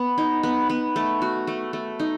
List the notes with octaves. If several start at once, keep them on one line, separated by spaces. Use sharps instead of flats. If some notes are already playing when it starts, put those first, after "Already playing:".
Already playing: B3
D#4
B3
B3
A3
F#4
A3
A3
D#4